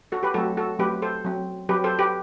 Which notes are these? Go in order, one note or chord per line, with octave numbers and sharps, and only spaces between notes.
F#4 A4
G4 B4
F#3 A3 C4 F#4 A4
F#4 A4
F#3 A3 C4 G4 B4
A4 C5
F#3 C4
F#3 C4 G4 B4
A4 C5
G4 B4